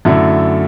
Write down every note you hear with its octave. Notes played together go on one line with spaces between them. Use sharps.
F#2 D3 A3 E4